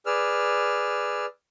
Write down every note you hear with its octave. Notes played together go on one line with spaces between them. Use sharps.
G#4 B4 D5 E6 F6